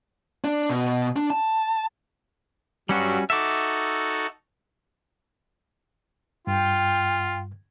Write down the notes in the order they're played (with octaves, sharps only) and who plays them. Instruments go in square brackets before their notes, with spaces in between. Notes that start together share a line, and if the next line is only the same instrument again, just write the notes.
[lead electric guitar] D4
B2
D4
A5
[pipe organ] G2 F#3 [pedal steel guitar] G3 C#4 F#4
[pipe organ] D#4 F#4 A4 [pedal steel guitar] E5 D6
[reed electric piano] G2 [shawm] F4 [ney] G5